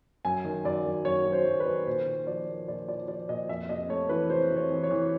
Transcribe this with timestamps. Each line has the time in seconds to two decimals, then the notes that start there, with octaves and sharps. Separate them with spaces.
0.25 F#2 G#5
0.44 D#3
0.65 F#2 D5
0.86 F#2
1.05 F#2 C#5
1.26 F#2
1.33 C5
1.46 F#2
1.60 B4
1.66 D#3
1.87 A#2 C5
2.06 A#2
2.27 F3 D5
2.48 A#3
2.68 A#2 D5
2.88 F3 D5
3.08 F3 D5
3.29 A#2 D#5
3.49 F2 E5
3.69 C3 D#5
3.89 A3 C#5
4.09 E3 B4
4.30 C3 C5
4.50 C3
4.57 C#5
4.71 E3
4.84 C#5
4.90 E3